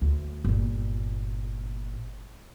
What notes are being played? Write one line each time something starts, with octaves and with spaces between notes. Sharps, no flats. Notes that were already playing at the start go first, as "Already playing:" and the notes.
D2
G1 A#2